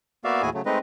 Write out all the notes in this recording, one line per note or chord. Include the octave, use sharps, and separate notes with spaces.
A#3 B3 F#4 D5 E5 F5
D#2 A2 E4 F#4 G#4 G#5
C#3 F#3 A3
G#3 A3 C4 D#4 B4 D#5